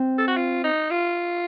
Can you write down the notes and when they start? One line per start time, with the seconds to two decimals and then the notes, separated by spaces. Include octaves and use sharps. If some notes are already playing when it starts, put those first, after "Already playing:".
Already playing: C4
0.18 A4
0.28 F#4
0.37 F4
0.64 D#4
0.91 F4